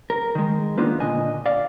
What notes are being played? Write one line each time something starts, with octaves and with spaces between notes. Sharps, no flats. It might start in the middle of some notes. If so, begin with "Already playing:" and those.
A#4
D#3 G#3
A#3 B3 D4 D#4 F4 B4
A#2 D3 D#5 G#5
D5 F5